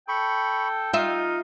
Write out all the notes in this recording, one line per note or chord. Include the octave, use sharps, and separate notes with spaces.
A4 G5 B5 C#6
D#4 F4 E5 F5